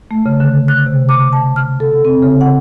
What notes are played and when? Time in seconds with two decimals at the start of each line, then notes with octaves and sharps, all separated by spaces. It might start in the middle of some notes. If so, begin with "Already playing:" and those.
0.11 A3
0.26 C#3
0.40 D3
0.68 F#6
0.86 C3
1.09 D6
1.33 A5
1.56 F6
1.80 A4
2.05 C4
2.22 C#3
2.41 F#5